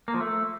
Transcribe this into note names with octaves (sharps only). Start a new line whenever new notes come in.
A#3
F3
A3